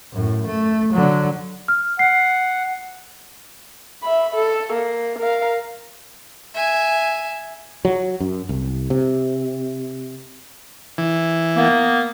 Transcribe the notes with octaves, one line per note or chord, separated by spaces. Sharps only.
F#2 A2
A3
D3 F#3
F6
F#5 C7
E5 B5
A4
A#3
A#4 F5
E5 G#5
F#3
F#2
C2
C3
E3
A#3 B3